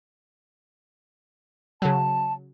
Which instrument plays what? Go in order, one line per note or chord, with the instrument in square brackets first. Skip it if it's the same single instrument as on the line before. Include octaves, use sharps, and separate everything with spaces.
[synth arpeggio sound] C#3 F#3 [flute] A5